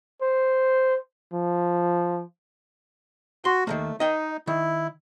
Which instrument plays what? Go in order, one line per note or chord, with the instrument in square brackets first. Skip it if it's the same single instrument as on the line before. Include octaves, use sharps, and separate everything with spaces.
[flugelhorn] C5
F3
[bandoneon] F#4 [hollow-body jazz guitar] C6
[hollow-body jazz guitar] D#3 F3 A#3 [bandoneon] A3
[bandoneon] D#4 [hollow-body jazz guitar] D#5 G5
[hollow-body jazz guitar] D#3 [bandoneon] E4